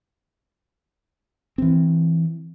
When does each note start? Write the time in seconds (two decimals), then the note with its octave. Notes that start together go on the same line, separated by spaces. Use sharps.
1.58 E3 C4